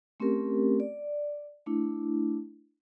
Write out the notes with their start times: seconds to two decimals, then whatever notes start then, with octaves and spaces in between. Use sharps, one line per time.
0.20 A3 C4 C#4 G4 A#4
0.80 D5
1.66 A3 D4 E4